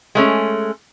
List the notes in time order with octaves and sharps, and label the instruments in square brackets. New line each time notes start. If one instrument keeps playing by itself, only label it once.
[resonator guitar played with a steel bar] G#3 A3 C#4